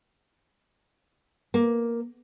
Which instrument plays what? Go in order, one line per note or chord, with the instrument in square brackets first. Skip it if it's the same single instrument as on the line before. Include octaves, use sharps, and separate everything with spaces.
[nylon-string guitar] A#3